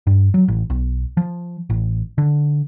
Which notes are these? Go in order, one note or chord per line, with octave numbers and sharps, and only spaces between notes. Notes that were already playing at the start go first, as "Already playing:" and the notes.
G2
F#3
A1
B1
F3
A1
D3